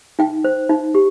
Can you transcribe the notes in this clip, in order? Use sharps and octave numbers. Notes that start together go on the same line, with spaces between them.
D#4 G5
C5
D#4
G4